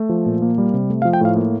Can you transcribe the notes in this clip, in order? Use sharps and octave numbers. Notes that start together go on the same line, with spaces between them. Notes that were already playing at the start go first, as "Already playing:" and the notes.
Already playing: A3
F3
A#2
A#3
G3
C3
A3
F5
F3
G5
A2 F5
A#3